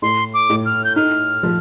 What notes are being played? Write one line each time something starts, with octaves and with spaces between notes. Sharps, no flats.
A2 C6
D6
A2
F6
G6
D#4 F6
F3